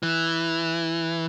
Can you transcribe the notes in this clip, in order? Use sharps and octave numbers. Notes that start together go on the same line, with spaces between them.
E3